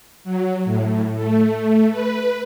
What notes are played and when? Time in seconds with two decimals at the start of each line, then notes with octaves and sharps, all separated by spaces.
0.24 F#3
0.65 A2
1.15 A3
1.90 B4